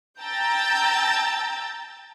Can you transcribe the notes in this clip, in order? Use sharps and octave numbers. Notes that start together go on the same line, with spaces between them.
G5 A5 A#5 E6 G6 A6